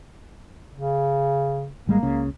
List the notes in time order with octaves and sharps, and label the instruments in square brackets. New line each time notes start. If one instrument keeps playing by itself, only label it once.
[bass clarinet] C#3
[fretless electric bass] G#1 G3 G#3 [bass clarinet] A#3
[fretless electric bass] C#2 C#3